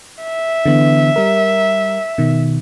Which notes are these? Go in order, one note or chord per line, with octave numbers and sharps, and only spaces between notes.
E5
D3 E3 B3
G3 A#4
B2 D#3